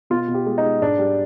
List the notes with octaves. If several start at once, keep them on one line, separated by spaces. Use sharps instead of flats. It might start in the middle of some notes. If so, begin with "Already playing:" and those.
B2 F4
B2
G4
G#3
D#4
G#3
G#2 D4
G3